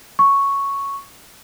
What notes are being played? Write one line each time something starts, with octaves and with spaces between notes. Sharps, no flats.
C#6